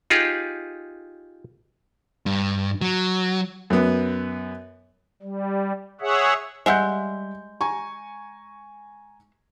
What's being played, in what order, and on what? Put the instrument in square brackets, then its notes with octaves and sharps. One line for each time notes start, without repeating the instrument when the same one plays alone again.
[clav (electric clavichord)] D#4 F4 G4 G#4
[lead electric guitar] G2
F#3
[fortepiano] F#2 B3
[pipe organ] G3
G#4 C#5 E5 F#5
[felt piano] G3 G6 [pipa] G#3 E5 F#5
[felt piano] G#5 A#5 C#6